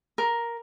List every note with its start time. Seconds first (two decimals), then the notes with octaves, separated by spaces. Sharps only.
0.18 A#4